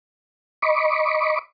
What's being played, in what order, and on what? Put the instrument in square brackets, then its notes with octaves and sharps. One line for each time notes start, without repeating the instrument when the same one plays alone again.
[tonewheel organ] D#5 B5 C#6 D6